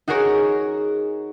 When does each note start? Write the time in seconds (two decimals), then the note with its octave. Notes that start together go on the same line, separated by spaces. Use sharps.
0.08 D#4 F#4 G#4 A#4 C#5